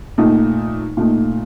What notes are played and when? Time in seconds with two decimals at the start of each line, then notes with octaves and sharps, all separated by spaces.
0.18 A#2 A3 D#4
0.97 A#2 A3 D#4